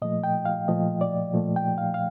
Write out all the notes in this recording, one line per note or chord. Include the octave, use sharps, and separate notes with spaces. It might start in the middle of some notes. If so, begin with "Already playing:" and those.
A#2 F3 A3 D#5
G5
F5
A#2 F3 A3 D#5
D5
A#2 F3 A3
G5
F5
F5